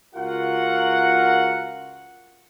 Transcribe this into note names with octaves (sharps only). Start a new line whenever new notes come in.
C#2 F4 F#4 A#4 F#5